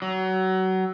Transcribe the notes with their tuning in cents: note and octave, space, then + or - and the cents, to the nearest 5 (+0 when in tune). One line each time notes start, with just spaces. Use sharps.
F#3 +25